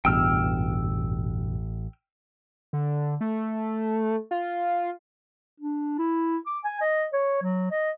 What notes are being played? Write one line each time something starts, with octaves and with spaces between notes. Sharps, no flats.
A1 E2 G2 B2 G5 E6 F6
D3
A3
F4
D4
E4
D6
G#5
D#5
C#5
F#3
D#5